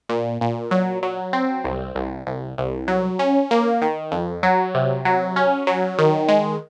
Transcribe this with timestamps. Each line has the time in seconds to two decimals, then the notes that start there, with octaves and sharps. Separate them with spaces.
0.09 A#2
0.41 A#2
0.71 F#3
1.03 F#3
1.33 C4
1.64 C2
1.95 C2
2.27 C2
2.58 C2
2.88 F#3
3.19 C#4
3.51 A#3
3.82 D#3
4.12 F2
4.43 F#3
4.75 C3
5.05 F#3
5.36 C#4
5.67 F#3
5.99 D#3
6.28 G#3